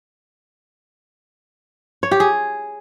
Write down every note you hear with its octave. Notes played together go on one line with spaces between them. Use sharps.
C#5
G4
G#4